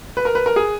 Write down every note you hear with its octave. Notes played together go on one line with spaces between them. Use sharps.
B4
A#4
B4
A#4
G#4